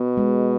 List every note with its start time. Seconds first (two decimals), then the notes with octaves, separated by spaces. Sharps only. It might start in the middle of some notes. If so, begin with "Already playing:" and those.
Already playing: B2 B3
0.17 G#3